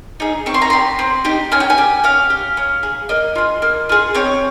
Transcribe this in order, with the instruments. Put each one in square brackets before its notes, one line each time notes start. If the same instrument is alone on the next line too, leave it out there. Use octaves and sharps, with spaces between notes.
[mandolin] D#4 G#4
C4 C#6
C6
A#5
G4 C6
C4
D#4 G4
C#4 G#5
G5
G#5
G4
C#4 F5
G4
C#4
G#4
A#3 D#5
F4 G#4
A#3
F4 G#4
C4 C#5